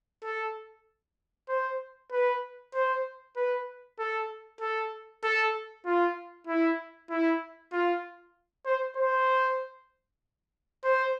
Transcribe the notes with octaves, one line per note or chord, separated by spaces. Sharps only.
A4
C5
B4
C5
B4
A4
A4
A4
F4
E4
E4
F4
C5
C5
C5